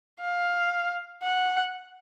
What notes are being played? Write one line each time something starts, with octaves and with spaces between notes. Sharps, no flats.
F5
F#5